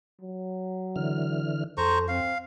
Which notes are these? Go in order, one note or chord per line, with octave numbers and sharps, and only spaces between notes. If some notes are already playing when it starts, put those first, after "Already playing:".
F#3
D3 E3 F6
F2 A4 C5 A#5 C#6
C4 F5